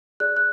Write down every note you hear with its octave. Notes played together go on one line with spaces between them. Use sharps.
G#4 D5 F#6
F#6